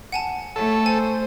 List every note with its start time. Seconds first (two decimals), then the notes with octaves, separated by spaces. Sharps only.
0.12 F#5 G#5 A5
0.56 A3 A4 C#5
0.86 C5 G#5